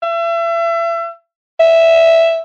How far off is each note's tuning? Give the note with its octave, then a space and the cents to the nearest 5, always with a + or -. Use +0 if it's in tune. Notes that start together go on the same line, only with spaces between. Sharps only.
E5 +35
E5 +0